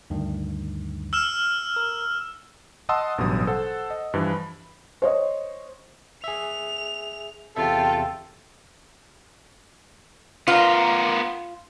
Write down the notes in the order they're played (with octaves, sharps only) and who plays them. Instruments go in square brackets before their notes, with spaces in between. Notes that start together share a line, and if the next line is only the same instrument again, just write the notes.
[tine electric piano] D2 G2 D#3
[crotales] E6 F6 E7
[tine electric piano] A#4
[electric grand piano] D#5 F#5 A5 C6 D#6 E6
A1 G2 B2 F#3 D#6
A4 C5 F#5 A5
D#5
G2 E3 F3
B5
[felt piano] C5 C#5 D#5
[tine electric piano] G#4 E5 [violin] F7
[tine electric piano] E2 C3 E5 [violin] F4 G5 [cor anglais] A4
[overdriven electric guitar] B3 A#4 [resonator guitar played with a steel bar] F4